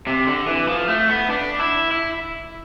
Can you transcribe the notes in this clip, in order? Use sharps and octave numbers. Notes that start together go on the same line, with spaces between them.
C3
D3
E3
F3
A3
B3
D4
E4
E4